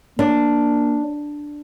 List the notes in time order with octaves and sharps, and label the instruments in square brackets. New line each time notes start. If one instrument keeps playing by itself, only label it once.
[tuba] A#3 [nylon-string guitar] D4